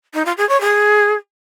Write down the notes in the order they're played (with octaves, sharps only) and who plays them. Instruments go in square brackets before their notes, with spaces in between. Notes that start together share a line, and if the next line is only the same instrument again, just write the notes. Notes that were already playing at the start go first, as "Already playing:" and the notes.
[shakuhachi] D#4
F4
G#4
C#5
G#4